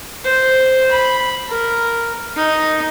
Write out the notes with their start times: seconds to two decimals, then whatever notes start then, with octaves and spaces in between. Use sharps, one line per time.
0.25 C5
0.91 B5
1.48 A#4
2.36 D#4